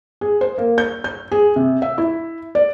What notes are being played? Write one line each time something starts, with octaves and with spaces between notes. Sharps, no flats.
G#4
C5
A#3
G6
G6
G#4
C3
E5
E4
D5